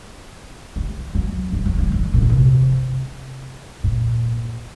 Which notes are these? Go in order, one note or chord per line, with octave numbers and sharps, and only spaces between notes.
G3
F#3
G3
F#3
G3
F#3
A#2
B2
C3
A#2